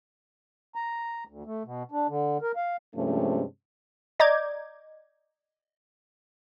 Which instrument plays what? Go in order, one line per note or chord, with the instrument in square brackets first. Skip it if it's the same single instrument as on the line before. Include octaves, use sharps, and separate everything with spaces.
[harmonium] A#5
D2
A3
B2
D4
D3
A#4
F5
[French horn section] G2 C3 F3 G#3 A3 C#4
[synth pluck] D5 D#5 A#5 D6 G6 G#6